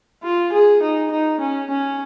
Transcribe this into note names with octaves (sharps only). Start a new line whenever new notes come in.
F4
G#4
D#4
D#4
C#4
C#4